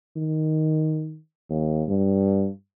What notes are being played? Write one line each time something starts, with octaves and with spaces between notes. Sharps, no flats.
D#3
D#2
G2